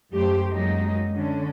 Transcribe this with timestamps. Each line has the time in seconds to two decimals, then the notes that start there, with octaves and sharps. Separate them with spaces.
0.13 F#2 A3 G4 C5
0.52 F#2 F#3 G#3 A#3 D#4
1.14 D3 C#4